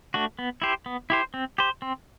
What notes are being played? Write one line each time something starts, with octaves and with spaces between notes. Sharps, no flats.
A3 D4 F#4
B3
E4 G4 C5
B3
E4 G4 C5
C4
G4 C5
C4